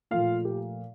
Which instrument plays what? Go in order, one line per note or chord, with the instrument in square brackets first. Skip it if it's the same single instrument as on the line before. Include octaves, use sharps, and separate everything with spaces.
[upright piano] A#2 F3 A3 F4 F5
G4